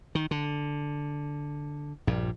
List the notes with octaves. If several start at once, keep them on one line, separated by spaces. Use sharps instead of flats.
D#3
D3
A#1 G2